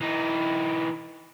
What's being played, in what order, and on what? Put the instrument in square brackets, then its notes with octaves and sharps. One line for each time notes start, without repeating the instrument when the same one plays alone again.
[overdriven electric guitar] E3 D#4